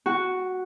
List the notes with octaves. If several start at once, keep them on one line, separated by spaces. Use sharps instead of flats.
F#4